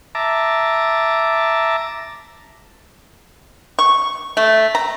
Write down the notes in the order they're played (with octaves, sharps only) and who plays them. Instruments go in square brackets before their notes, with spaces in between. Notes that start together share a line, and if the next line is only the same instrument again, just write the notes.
[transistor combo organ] E5 A5 A#5 D6
[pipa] C#6
A3
A#5